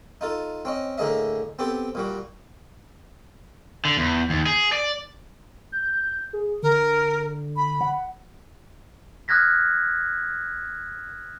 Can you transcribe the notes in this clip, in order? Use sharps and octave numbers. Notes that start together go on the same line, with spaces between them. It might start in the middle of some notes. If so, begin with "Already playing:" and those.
D#4 F4 A4
C4 C#4 D#5
A2 D3 A#3 G#4 D#5 E5
B3 C4 G4 A4
A#2 G3 F#4
D3
E2
D#2
G#4
D5
G6
G#4
D3 A#4
B5
F#5
D#6 F6 F#6 G#6 A#6 B6